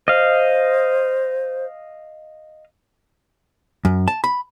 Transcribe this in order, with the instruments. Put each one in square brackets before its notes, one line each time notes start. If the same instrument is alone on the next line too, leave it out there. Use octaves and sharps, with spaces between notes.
[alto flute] C5 [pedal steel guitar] D#5 F5
[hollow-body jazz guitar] F#2
A5
B5